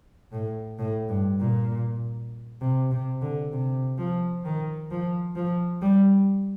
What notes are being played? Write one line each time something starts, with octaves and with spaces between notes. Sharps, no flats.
A2
A2
G2
A#2
C3
C3
D3
C3
F3
D#3
F3
F3
G3